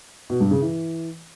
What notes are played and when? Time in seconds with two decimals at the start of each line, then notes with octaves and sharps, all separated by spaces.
0.30 B2
0.40 G2
0.51 C#3
0.62 E3